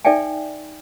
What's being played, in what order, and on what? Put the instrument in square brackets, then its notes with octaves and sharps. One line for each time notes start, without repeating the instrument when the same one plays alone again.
[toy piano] D#4 A4 D5 E5 G5 G#5